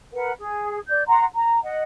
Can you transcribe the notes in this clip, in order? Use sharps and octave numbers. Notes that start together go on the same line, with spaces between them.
A#4 B4 F#5
G#4
D5 G6
F#5 A#5 C6
A#5
D#5 F#5